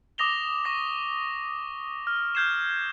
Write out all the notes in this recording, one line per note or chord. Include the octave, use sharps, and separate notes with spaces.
D6 D#6 A#6 F7 G7
C#6 D6 A#6
F6
F6 G6 G#6 C7 E7